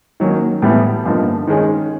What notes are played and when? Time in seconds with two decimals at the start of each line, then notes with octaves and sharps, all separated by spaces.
0.20 D#3 F#3 A#3 C#4
0.62 A2 E3 G3 B3 E4
1.05 G2 D3 F3 A#3 D#4
1.47 D#3 G#3 C#4